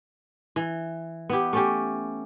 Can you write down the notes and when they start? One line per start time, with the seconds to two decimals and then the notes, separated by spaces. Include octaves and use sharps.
0.56 E3
1.29 B3 E4 G4
1.53 A3 C#4 G4